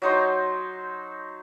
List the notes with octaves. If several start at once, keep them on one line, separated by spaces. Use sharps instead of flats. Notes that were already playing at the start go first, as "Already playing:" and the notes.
F#3 D#4 C5